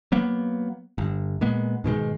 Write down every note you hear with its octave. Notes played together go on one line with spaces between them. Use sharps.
F#3 A#3 B3
G1
A#2 G#3 B3
G#2 B2 D#3 G#3